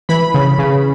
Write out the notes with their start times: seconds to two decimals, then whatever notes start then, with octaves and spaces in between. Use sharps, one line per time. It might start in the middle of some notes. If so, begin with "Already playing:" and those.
0.09 E3 B5
0.34 C#3
0.59 C#3